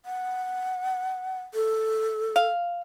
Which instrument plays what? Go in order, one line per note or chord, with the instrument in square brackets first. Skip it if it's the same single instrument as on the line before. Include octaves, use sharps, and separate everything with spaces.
[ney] F#5
A4
[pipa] F5